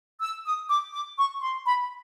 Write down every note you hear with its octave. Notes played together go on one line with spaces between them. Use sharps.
E6
D#6
D6
D6
C#6
C6
B5